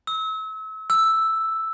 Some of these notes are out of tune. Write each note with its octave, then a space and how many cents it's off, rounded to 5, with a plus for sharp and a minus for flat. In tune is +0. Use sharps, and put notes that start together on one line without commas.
E6 -35
E6 +0